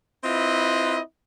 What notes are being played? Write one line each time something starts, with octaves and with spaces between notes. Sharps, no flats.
C4 E4 F4 B4 D#5